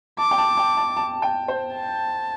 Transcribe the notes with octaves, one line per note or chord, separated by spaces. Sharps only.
A5 D6
G5
A5
G5
A5
A5
G5
C5
A5